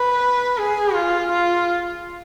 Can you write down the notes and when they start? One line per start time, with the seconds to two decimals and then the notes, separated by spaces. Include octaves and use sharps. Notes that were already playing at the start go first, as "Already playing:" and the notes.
Already playing: B4
0.58 G#4
0.94 F4
1.31 F4